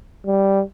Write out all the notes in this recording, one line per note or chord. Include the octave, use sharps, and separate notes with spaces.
G3